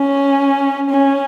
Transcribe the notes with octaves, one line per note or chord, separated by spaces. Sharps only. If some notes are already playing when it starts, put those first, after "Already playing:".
Already playing: C#4
C#4